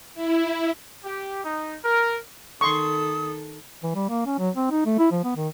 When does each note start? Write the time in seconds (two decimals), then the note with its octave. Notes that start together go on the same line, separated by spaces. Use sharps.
0.14 E4
1.04 G4
1.44 D#4
1.83 A#4
2.61 D#3 A4 C6 C#6 D#6
3.83 E3
3.95 G3
4.09 A#3
4.26 C#4
4.39 F#3
4.56 C4
4.71 D#4
4.86 A3
4.99 E4
5.12 F3
5.24 B3
5.36 D#3